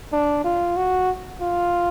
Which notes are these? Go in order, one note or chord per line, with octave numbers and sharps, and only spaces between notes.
D4
F4
F#4
F4